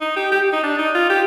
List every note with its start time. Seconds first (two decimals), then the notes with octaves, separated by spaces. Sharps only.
0.01 D#4
0.16 G4
0.32 G4
0.53 D#4
0.63 D4
0.79 D#4
0.94 F4
1.10 G4